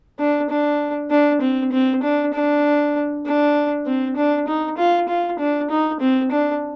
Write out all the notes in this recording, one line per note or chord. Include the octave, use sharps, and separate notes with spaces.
D4
D4
D4
C4
C4
D4
D4
D4
C4
D4
D#4
F4
F4
D4
D#4
C4
D4